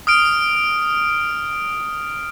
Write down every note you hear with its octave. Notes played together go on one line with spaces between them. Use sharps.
D#6 F6 D7